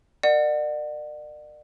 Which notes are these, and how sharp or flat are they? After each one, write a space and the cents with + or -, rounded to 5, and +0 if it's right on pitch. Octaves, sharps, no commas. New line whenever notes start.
A#4 +0 D5 +35 F#5 +0